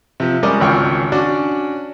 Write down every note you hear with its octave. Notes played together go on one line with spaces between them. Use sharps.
C3 F3
G3 G#3 C#4 A#4 D5 D#5
G#1 C#2 G5 C#6 F6
C#4 D4 F#4 D5